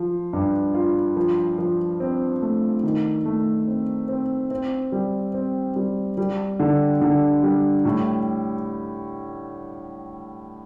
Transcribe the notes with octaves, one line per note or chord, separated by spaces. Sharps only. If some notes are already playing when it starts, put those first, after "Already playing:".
Already playing: F3 F4
G2
F4
F3
F3
C4
A3
D#3
A3
C4
C4
C4
G3
C4
G3
G3
D3
D3
G3
A2